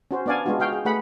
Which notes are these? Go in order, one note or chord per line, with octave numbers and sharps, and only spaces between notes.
C#4 F#4 C5
B3 D4 D5 F5 G#5
G#3 B3 D4 F4 F#4
F#4 F5 G5
G#4
A3 G#4 B4 F#5 B5